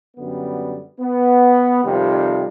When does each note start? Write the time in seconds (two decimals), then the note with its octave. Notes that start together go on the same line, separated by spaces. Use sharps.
0.16 F#2 D3 G3 B3
1.00 B3
1.84 F2 C3 D#3 G3